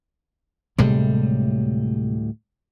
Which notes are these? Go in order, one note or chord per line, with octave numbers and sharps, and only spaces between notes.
D2 A2 C3 G3 G#3